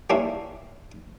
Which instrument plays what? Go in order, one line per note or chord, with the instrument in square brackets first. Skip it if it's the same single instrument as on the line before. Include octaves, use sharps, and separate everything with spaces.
[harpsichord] G3 A#3 C#4 D4 E4